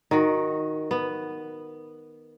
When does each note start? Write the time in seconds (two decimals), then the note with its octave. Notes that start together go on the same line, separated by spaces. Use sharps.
0.11 D#3 F#4
0.91 B3